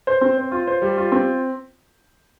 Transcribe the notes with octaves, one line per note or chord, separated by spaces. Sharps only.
C5
C4
C5
F4
C5
G3
F4
C4